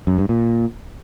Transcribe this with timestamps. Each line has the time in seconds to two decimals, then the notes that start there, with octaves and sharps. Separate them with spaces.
0.07 F#2
0.18 G2
0.29 A#2